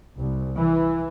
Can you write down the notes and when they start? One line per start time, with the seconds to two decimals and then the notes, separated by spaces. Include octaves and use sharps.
0.19 C2
0.57 E3